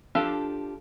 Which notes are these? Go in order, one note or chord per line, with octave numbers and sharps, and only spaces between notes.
F3 D4 G4 A4 F5